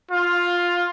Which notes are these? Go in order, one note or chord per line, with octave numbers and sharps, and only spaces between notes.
F4